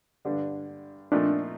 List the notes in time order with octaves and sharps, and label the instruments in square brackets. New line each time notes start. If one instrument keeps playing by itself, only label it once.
[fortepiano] G2 D3 G3 D4
[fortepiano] A#2 F3 A3 C4 D#4 [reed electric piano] D4